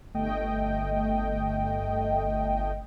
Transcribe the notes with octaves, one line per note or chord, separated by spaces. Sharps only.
G1 A3 D#5 G5